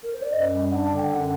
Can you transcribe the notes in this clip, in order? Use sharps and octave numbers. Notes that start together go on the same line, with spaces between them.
A#4
C5
D5
F#2 D#5
G3
D4 F#5
A5
D3
G5
F#2 F#5